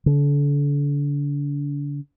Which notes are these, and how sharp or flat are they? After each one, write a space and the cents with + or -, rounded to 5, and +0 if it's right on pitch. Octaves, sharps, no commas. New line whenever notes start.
D3 -35